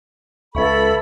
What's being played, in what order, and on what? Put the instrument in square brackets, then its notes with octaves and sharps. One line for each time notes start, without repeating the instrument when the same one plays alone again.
[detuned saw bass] C#2 [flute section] A4 B5 [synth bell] B4 E5 C#6